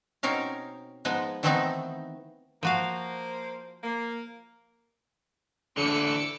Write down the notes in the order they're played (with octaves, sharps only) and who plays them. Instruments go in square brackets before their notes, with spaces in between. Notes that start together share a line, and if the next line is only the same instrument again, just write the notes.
[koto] B2 C4 C#4 D#4 A#4 F5
F3 G#3 B3 D#4
D#3 E3 A3 B3 C4 D#4
[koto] F3 F#4 F5 [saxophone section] A#3 C5
[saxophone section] A#3
[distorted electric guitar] A2 E3 [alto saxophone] D3 [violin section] D6 E6 C#7